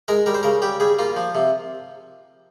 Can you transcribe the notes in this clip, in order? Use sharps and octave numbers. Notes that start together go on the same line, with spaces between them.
G#3 A#4
G3 A#4
C5
C#3 A#4
G3 G4
G3 G#4
A#3 F4
F3
C3